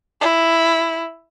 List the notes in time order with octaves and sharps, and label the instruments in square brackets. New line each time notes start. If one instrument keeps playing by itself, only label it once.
[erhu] E4